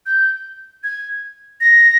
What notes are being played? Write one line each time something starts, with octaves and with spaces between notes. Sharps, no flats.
G6
G#6
A#6